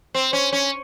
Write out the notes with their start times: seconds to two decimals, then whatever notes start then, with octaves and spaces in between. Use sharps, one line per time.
0.15 C4
0.33 C#4
0.53 C#4